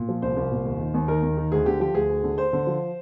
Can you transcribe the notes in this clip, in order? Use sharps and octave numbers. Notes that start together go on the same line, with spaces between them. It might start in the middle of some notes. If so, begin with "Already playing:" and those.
Already playing: A#2
F3
C2 C5
C2
A#2
D#2
D#3
D#2
D#3 A#4
D#2
D#3
D2 G#4
D3 G4
F3 G4
D2 G#4
D2
D3
D2 C5
D3
F3